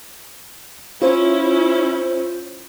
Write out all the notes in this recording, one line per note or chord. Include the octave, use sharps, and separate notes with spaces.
C#4 E4 F4 C5